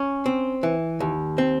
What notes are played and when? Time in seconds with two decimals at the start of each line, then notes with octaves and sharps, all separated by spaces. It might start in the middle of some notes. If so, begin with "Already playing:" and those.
Already playing: C#4
0.26 C4
0.63 E3
1.00 D#2
1.38 C4